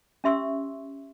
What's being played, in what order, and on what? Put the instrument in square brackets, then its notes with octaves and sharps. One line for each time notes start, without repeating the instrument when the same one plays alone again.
[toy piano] C#4 G4 E5 C6 C#6 E6